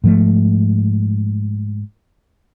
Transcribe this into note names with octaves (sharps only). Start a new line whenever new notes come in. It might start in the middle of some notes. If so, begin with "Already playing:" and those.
G#2 F3 A3